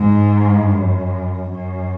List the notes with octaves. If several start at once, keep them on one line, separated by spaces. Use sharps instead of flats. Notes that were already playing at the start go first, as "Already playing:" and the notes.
Already playing: G#2
F#2
F#2